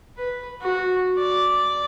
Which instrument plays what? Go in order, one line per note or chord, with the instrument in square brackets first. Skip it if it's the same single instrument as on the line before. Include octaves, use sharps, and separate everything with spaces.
[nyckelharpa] B4
F#4
D5